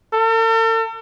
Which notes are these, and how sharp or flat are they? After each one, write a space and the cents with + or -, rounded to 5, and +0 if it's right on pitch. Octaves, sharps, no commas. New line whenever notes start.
A4 +45